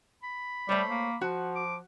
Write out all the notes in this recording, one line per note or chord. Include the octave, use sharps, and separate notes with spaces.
B5
G3 A3 C5 C#5
A#3
F3 F#4
D6